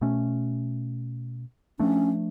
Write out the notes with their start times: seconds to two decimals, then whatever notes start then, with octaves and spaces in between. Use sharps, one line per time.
0.01 B2 A3 C#4
1.79 F3 A3 C#4 D4